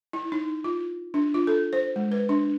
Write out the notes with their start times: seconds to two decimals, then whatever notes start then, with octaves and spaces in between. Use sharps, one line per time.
0.13 E4
0.32 D#4
0.64 F4
1.14 D4
1.34 F4
1.47 A4
1.73 C5
1.96 G#3
2.12 B4
2.29 D4